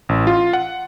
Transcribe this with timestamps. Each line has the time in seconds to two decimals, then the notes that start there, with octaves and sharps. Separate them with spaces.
0.09 A1
0.27 F4
0.53 F#5